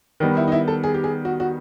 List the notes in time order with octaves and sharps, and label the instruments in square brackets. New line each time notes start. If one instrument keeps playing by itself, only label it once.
[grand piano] D#3 G3 B3 [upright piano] D#4
[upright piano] E4
D#4
E4
A4
G#4
G4
G#4
F#4
F#4